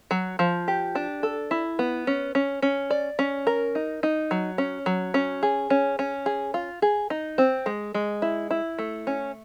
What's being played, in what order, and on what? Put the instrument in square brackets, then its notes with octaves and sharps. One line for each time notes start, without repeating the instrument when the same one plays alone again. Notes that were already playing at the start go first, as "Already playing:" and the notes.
[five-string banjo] F#3
F3
G4
D4
A4
E4
B3
C#4
C#4
C#4
D5
C#4
A#4
D#4
D#4
F#3
C#4
F#3
C#4
G#4
C#4
C#4
G#4
F4
G#4
D#4
C4
G#3
G#3
E4
E4
A3
C#4